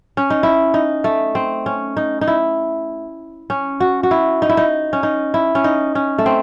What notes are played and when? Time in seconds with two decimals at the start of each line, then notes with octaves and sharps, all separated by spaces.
0.17 C#4
0.30 D#4
0.43 E4
0.74 D#4
1.04 A3
1.35 C4
1.66 C#4
1.97 D#4
2.21 D#4
2.28 E4
3.50 C#4
3.80 F#4
4.03 F#4
4.11 E4
4.42 D#4
4.49 E4
4.57 D#4
4.93 C#4
5.03 D#4
5.34 E4
5.55 C#4
5.64 D#4
5.95 C#4
6.18 A3
6.26 C4